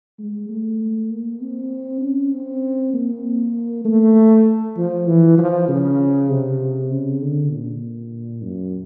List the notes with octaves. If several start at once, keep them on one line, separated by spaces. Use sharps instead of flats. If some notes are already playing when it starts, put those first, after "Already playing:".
G#3
A3
A#3
C4
C#4
C4
A#3
A3
F3
E3
F3
C#3
C3
C#3
D3
A#2
F#2